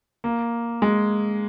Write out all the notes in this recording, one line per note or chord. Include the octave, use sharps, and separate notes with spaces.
A#3
G#3